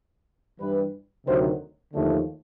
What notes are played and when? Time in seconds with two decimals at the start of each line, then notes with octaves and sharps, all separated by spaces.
0.58 G2 E3 G3 B4
1.25 D2 C3 D#3 F#3 C5
1.92 D#2 D3 F3 A3